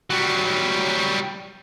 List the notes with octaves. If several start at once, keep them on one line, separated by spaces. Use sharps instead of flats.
F#3 G3